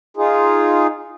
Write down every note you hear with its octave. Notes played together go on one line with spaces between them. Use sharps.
D#4 F4 G#4